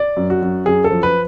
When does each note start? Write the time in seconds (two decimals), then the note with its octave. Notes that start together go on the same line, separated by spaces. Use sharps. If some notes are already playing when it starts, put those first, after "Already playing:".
Already playing: D5
0.17 F#2
0.30 F#4
0.42 F#2
0.66 F#2 G#4
0.84 A4
0.90 F3
1.03 B4